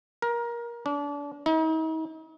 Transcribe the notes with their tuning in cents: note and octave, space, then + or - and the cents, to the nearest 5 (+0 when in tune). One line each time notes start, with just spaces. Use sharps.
A#4 +20
D4 -35
D#4 +45